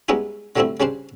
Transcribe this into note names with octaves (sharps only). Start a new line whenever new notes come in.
G3 G#3 B3 C#4 D#4 E4
D3 F#3 G3 A3 C4 E4
C#3 G3 C#4 D4 C5